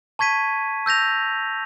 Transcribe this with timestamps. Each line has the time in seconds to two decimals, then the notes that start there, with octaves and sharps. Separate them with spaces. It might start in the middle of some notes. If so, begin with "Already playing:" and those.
0.19 A5 C#6 G#6 B6 D#7
0.86 E6 G6 A#6 F7